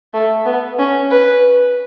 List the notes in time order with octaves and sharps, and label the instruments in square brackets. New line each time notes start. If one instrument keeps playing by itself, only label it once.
[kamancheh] A3
B3
C#4
B4